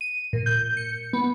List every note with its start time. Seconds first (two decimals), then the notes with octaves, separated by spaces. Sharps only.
0.01 D#7
0.33 A#2
0.46 G6
0.77 C#7
1.13 B3